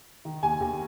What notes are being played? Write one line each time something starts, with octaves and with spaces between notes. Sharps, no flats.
D#3
D#2 G#5
D#2